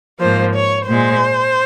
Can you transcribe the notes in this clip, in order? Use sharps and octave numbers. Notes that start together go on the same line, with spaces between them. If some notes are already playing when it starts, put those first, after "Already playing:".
G#2 F3 A#3 C5
C#5
A#2 G#3 C5